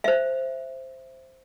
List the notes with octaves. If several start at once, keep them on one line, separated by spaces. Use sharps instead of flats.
C5 E5